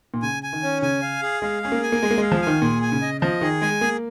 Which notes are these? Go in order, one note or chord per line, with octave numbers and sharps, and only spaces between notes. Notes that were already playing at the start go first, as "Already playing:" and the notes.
A#2
C#3 G#5
G#5
D#3
C#4
C#3 G#5
F5
G#4
G#3 F5
C#4 G#4
A#3
G#5
A#3
G#3 G#4
A#3
G#3 F5
F3
D#3 G#5
A#2 G#4
G#5
C#3
D#5
F3 D#5
D#3 G#4
G#3 G#5
A#3 G#4